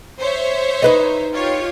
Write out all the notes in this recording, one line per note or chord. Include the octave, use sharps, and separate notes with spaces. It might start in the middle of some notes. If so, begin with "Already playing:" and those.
C5 C#5 E5
D#4 B4 D#5
F4 G4 C#5